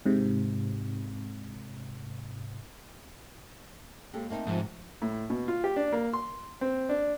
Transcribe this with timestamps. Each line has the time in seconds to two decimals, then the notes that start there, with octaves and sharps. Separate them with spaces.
0.06 G#2 C3
4.13 D#2 G#3 G4 A4
4.30 A3 A#3 C4 D#4
4.47 G#2 C3 F3
5.02 A2
5.30 B2
5.48 F4
5.64 G4
5.76 D4
5.92 A#3
6.13 C6
6.61 C4
6.89 D4